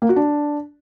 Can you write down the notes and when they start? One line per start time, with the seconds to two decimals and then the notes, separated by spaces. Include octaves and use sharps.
0.02 A#3
0.09 F#4
0.16 D4